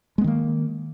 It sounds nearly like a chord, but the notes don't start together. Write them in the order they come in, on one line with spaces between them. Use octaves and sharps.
G#3 B3 D#3 A#3